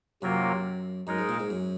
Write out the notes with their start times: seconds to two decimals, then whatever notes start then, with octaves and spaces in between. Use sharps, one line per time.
0.22 F#2 C3 F#3 A#3 F4 A#4
1.07 F#2 G#3 D#4 A#4
1.19 G#2
1.29 A#2
1.39 G#2
1.50 F#2